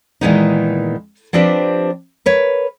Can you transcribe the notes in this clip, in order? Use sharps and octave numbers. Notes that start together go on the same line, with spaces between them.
A#2 D#3 E3 G#3 B3 D#4
F3 C4 D4 G4 B4 D5
A#4 B4 C#5